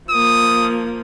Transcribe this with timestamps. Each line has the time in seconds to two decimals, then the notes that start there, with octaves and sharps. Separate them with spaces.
0.10 F3 A#3 D#6